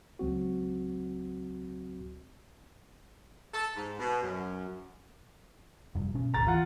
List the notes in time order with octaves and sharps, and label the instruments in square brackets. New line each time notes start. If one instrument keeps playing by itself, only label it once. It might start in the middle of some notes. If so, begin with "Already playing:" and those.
[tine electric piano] C#2 F#3 C4 F#4
[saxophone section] A4
G#2
B2
F#2
[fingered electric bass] F1 G2
B2 C#4
[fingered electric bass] G#1 D2 [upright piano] A#5 A6
[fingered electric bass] E3 [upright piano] F4 F#5